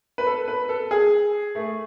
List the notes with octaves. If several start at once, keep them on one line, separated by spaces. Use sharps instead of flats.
B4
A4
B4
A4
G#4
A3